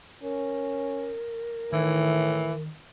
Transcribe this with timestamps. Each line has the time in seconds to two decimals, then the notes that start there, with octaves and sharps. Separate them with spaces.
0.23 C#4 A#4
1.73 A2 D#3 E3